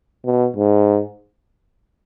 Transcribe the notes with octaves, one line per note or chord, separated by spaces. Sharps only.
B2
G#2